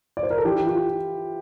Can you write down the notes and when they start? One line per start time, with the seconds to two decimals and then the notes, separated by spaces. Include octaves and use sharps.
0.17 D5
0.23 C5
0.30 A#4
0.38 A4
0.45 E3 G4
0.66 F4